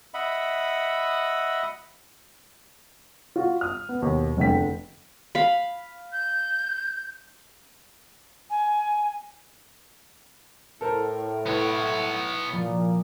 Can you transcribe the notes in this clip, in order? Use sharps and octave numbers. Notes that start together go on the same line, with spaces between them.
D#5 E5 F#5 B5
F4 F#4
D#6 F6
B3
D#2 B2
F1 E2 D3 G5 B6
F5 B5
G6
G#5
A2 A4 A#4 C5
B3 E4 B4 C#5
A#2 F3